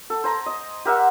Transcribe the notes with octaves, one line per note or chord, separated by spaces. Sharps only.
A4
C5 G#5 A#5
D#5
G4 A#4 E5 F#5